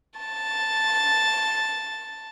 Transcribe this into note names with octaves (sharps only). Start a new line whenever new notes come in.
A5 A6